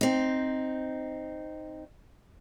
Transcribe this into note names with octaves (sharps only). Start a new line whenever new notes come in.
C4 D#4